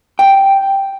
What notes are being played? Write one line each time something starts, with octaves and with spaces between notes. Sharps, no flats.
G5